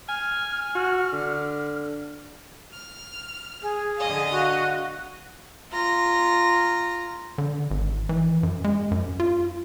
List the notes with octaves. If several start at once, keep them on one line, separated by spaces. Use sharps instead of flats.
G#5 F6
F#4
D3
F6
G#4
D3 D#5 F5
F#4
F4 A#5 A#6
D3
G#1
E3
F#2
G#3
F#2
F4